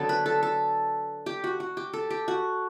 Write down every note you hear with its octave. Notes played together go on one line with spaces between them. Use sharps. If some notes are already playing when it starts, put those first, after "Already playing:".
Already playing: D3 F#3 B3 A4
B4
A4
A4
G4
F#4
F#4
G4
A4
G4
F#4